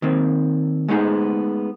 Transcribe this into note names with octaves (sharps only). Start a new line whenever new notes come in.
D#3 A#3 C4
G#3 A3 B3 D#4 G#4